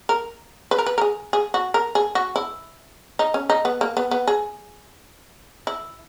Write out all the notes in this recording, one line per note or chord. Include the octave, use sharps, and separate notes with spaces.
A#4
B4
A#4
B4
A#4
G#4
G#4
F#4
A#4
G#4
F#4
E4
D#4
C#4
D#4
B3
A#3
B3
B3
G#4
E4